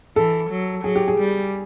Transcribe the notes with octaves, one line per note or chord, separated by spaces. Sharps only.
E3 A4
F#3
F#3 G#4
G4
G#4
G3